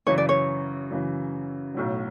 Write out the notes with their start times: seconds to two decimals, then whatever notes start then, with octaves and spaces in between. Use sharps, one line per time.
0.07 F#2 C#3 E3 C#5
0.18 D5
0.29 C#5
0.91 F#2 C#3 E3
1.74 B1 A2 F#3